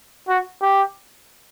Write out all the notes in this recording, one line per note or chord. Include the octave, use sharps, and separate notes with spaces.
F#4
G4